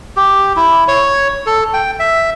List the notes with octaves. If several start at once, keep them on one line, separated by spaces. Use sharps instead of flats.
G4
E4
C#5
A4
G5
E5